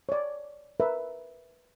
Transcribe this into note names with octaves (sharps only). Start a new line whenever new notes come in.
C#5 D5
A#4 B4 E5